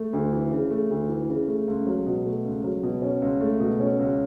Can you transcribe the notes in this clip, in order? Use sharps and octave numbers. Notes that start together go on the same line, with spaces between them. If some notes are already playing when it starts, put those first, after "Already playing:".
Already playing: A3
D2
E3
C#3
A3
D2
E3
C#3
A3
C#2
F#3
B2
A3
C#2
F#3
B2
C#4
C#2
A3
B2
C#4
C#2